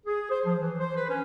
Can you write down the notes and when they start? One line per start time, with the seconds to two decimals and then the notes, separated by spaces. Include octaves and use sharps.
0.06 G#4
0.30 C5
0.45 F3
0.60 E3
0.80 C5
0.96 B4
1.09 C#4